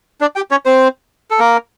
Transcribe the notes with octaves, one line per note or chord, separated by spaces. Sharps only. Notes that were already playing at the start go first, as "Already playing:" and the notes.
D4 D5
G4 G5
C#4 C#5
C4 C5
A4
A#3 A#4